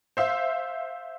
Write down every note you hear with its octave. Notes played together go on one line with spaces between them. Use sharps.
C5 E5 F5